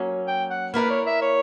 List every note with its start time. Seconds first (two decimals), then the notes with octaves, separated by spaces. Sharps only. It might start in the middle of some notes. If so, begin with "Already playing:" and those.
Already playing: F#3 A#3 C#4
0.27 G5
0.50 F#5
0.74 A#3 E4 A#4 B4 D5
0.90 C#5
1.06 E5
1.22 C#5